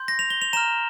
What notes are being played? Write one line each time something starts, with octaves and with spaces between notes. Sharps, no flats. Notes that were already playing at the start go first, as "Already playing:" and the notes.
Already playing: C6 G6
A#6
F7
G7
F7
A#5 F6 E7